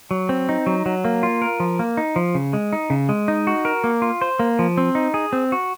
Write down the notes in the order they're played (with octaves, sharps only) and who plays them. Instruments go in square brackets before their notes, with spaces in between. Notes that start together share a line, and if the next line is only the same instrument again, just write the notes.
[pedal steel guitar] F#3
C4
D#4
F#3
F#3
A#3
F4
A#4
F3
A#3
D#4
F3
C#3
G#3
D#4
C#3
G#3
D#4
F#4
A#4
A#3
F4
C5
A#3
F3
C4
D#4
G#4
C4
F#4